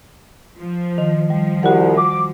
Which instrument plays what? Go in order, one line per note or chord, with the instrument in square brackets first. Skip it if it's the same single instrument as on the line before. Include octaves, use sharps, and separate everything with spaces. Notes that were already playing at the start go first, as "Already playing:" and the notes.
[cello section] F3
[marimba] D#3
[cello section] F3 [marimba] G3
[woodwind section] C2 [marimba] F#4 F#5
[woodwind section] D6